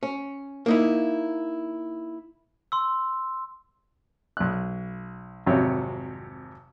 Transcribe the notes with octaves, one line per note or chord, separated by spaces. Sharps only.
C#4
A#3 D#4 E4
C6 E6
B1 F#6
G#1 F2 C3 F#3 C#5